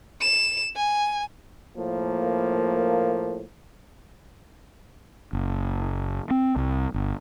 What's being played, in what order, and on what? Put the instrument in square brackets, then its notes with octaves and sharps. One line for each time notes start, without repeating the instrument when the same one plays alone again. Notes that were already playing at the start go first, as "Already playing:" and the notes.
[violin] E7
G#5
[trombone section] A2 F3 A#3
[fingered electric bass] F#1
C4
C2
G1